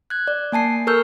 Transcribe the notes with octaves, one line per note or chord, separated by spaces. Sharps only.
F#6 G#6
D5
A#3 G#5 A5 C7
A4 A#4 C#6 E6 F6 G6